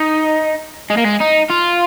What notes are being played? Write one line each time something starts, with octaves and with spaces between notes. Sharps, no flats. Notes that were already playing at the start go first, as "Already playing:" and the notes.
Already playing: D#4
G#3
A#3
G#3
D#4
F4